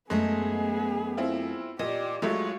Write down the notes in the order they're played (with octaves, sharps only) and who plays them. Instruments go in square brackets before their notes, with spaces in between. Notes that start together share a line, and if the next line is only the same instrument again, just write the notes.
[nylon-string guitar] F#2 A3 D#5 [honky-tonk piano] G#3 [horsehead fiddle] B3 G#4
[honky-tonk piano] C4 E4 F4
[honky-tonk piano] A#2 [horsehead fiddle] G4 D5 [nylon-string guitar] D#5
[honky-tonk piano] F#3 G#3 A3 [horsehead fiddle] F4 C#5 [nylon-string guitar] G4